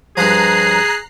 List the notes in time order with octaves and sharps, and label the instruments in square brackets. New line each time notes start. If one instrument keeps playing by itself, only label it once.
[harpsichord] G2 F3 [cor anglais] G#4 [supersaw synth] A#5 F#6 C7